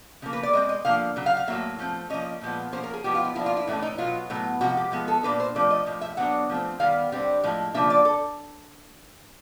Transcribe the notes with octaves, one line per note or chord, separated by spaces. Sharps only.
C#3 F3 A#3
B4
D5
B2 G#3 C4 D#5
D#5
D3 F3 A#3 F5
C#3 F#3
F5
F5
A2 F#3 A#3 E5
F3 A3 C4
F3 A#3 C#4 D#5
A#2 F3 G#3 B3
F3 A#3 C#4 C5
A#4
G#4
F3 G#3 B3 G4
F4
E4
F3 A#3 D4 E4
F4
E4
A2 E3 A3 C#4 D#4
D#4
B2 F#3 B3 F4
A2 F#3 B3
C3 F3 G#3 F#4
G4
F3 G#3 B3
A4
A#2 F3 A#3 D4 B4
C5
F3 A3 C4 D5
D#5
A2 F3
E5
D3 F#3 B3 D4 F#5
F3 A3 C4
D#3 G3 B3 F5
D3 G3 C4
A2 F3 G#3
C#3 F3 A#3 D4 E5
D5
A4